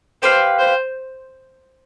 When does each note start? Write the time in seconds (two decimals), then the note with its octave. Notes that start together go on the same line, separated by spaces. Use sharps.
0.23 G4 B4 C5 F5
0.59 C5